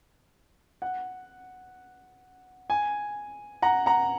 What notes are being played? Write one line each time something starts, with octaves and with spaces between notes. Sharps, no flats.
F#5
G#5
F#5 A#5
F#5 A#5